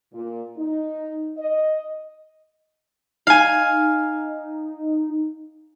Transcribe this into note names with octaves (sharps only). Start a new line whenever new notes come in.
A#2
D#4
D#5
D#4 F5 G#5